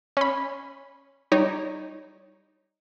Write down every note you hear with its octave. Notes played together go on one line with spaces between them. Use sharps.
C#4 B5
G3 D#4 C#5